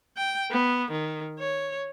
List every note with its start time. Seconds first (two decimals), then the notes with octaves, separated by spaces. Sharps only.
0.17 G5
0.51 B3
0.92 D#3
1.39 C#5